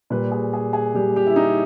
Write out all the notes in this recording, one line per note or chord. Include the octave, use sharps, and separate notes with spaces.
A#2 G3 B4
G#4
G#4
G#4
A#2 G3 G4
G4
E4
D#4